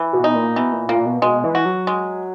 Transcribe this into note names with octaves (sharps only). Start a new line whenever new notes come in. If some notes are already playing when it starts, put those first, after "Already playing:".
Already playing: E3
B2
D#4
A#2
B2 E3
A#2
A#2 A#3
B2
B2 G#3
E3
F#4
F#3
G#3